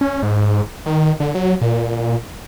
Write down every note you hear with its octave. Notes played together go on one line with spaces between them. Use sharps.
C#4
G#2
D#3
D3
F#3
A#2